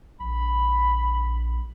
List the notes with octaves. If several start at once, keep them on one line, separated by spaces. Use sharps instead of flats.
A#1 B5